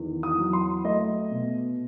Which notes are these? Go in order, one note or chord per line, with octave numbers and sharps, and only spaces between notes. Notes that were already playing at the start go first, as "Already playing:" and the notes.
Already playing: E2 D#3
D#6
F#3
C6
A3 D#5
B2